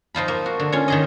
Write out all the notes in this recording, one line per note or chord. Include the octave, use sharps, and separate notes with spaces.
F3 D#4 F4 B5
A#3
F#4
D3
C#4 F4 C#5
D#3 G#4 D#5